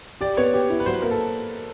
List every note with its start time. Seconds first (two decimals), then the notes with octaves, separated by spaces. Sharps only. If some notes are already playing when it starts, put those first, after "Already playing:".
0.21 G4 D5
0.37 B3 C#5
0.54 G4
0.70 E4
0.80 B4
0.86 F#3 C5
0.93 B4
1.02 A#3 A#4
1.11 A4